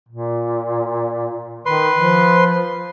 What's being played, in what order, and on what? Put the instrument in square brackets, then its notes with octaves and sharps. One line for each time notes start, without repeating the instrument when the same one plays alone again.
[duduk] A#2
[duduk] D#3 [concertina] B4 C6
[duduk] F3